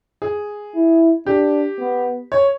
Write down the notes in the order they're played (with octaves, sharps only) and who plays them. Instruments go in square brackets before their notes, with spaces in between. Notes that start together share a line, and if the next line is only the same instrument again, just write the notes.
[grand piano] G#4
[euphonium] E4
[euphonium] D4 [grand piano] G4
[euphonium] B3
[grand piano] C#5